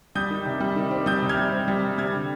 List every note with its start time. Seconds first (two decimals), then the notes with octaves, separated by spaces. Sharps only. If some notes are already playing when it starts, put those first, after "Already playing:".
0.15 G3 D#6 G6
0.31 D#3
0.46 C3
0.60 G3
0.76 D#3
0.91 C4
1.06 G3 D#6 G6
1.22 C3
1.29 F6 G#6
1.38 G3
1.52 C4
1.68 G3
1.83 C3
1.98 G3 F6 G#6
2.14 D3